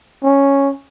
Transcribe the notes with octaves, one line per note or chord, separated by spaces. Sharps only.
C#4